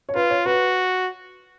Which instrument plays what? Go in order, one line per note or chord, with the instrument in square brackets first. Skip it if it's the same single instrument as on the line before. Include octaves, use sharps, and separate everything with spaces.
[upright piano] C#5
[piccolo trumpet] F4 [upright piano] B4
[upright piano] C#5
[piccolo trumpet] F#4 [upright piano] B4